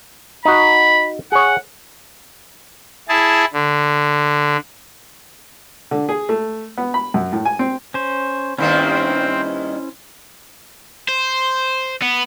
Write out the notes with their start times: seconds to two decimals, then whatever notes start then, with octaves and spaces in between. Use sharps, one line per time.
0.45 D#4 F#4 B5
1.32 G#4 C#5 F#5
3.09 E4 G#4 A5
3.53 D3
5.91 D3
6.09 G#4
6.29 A3
6.77 B3
6.94 B5
7.14 F#2
7.33 A2
7.45 G#5
7.59 C4
7.94 C#4 C5
8.58 G2 D#3 A#3 C4 C#4 E4 C5
11.09 C5
12.02 B3